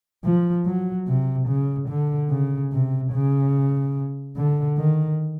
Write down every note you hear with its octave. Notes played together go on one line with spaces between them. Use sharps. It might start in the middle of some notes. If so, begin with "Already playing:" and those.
F3
F#3
C3
C#3
D3
C#3
C3
C#3
D3
D#3